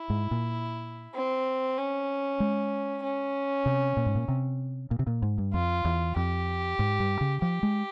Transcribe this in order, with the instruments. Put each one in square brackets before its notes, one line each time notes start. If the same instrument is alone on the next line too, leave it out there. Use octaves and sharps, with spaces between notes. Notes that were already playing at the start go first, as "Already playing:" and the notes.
Already playing: [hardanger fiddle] E4
[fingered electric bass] G#2
A#2
[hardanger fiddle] C4
C#4
[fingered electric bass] G#3
[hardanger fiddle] C#4
[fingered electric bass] C3
A#2
G#2
A#2
C3
A#2
C3
A#2
G#2
G2
[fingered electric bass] F2 [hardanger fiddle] F4
[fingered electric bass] E2
[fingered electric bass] F2 [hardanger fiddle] G4
[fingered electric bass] G#2
G2
C#3
[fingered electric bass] F3 [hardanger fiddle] G4
[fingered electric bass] G#3